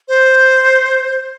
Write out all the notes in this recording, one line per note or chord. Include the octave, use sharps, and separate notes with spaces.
C5